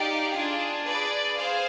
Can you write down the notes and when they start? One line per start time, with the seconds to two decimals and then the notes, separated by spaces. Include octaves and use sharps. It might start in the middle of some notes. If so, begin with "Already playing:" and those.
Already playing: D#4 G4 D5 F5
0.36 D4 F4 G#4
0.86 G#4 B4 D5
1.37 G#4 C5 F5